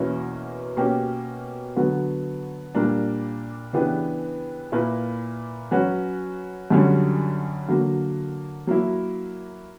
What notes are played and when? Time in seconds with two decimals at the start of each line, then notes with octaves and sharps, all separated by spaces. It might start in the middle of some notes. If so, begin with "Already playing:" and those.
Already playing: E2 B2 A#3 C#4 E4
0.77 B2 A#3 C#4 G4
1.76 D3 F#3 B3 F#4
2.75 A#2 G3 A#3 D4 A#4
3.73 C#3 E3 B3 D4 G4
4.72 A#2 A#3 E4 B4
5.71 F#3 C#4 F#4 B4
6.70 F#2 D3 G3 C#4
7.68 D3 F#3 A#3
8.67 F#3 A#3 E4